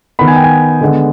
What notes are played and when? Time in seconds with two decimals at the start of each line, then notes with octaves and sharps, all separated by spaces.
0.19 D#3 B3 B5
0.28 G#5
0.36 G5
0.44 G#5
0.81 D3 G#3 B3